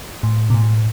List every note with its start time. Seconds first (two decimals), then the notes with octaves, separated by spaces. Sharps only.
0.23 A2
0.50 B2
0.54 A2